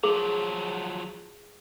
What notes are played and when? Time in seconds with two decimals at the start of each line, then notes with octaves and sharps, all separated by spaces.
0.04 F3 F#3 G#4